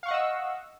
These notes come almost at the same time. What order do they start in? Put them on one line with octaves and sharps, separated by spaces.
F5 C#6 F#5 D#5 E6